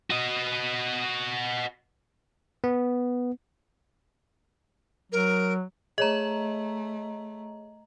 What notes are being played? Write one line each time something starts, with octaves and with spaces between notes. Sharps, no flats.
F#4 D#5
B3
F#3 A#4
A3 G#4 C#5 D#5 A#5 E7